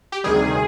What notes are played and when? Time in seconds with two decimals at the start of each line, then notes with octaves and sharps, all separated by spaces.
0.12 G4
0.24 D2 C3 D#3 G3 G#4